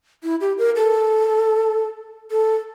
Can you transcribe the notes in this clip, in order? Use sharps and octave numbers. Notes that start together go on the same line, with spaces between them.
E4
G4
A#4
A4
A4